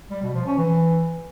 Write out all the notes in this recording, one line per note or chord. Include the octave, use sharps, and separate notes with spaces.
G3
B2
F3
C#4
E3